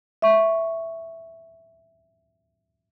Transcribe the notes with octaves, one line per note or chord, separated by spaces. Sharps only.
E5 C#6